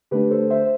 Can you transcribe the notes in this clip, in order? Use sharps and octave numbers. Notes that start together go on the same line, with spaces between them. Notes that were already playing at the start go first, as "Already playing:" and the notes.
D3 A3 D4 G4 B4
A4 C5
C5 E5